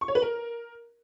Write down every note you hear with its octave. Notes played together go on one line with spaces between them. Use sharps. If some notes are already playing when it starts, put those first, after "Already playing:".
C#6
C#5
B4
A#4